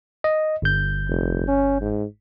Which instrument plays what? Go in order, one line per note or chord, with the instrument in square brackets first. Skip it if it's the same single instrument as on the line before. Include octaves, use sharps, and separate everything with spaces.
[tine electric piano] D#5
G1 G6
[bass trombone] F1
C#4
G#2